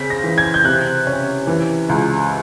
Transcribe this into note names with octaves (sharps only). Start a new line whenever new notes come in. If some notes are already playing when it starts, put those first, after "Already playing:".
Already playing: C#3 C4 B6
A#6
E3
G#6
G6
C3 F#6
C#4
E3
C#2